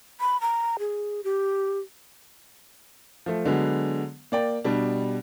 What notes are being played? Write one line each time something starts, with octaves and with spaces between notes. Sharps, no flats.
B5
A#5
G#4
G4
F3 A3
D3 F#3 G#3 B3
A#3 D5 G5
B2 G3 D4